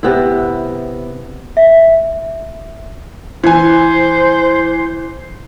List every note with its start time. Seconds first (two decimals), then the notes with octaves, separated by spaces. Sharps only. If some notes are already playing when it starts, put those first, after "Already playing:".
0.03 C3 B3 E4
1.57 E5
3.44 E3 C5 G#5